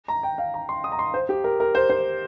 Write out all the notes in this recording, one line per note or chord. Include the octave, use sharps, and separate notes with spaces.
A#5
G5
F5
A#5
C6
D#6
A#5
C6
C5
G4
A#4
A#4
C5
C5